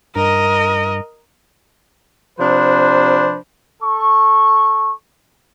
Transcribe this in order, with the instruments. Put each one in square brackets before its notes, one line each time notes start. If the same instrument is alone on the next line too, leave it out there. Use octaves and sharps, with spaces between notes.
[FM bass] G2 [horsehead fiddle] A#4 D#5
[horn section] C3 F3 D4 B4 C5
[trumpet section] A4 C#6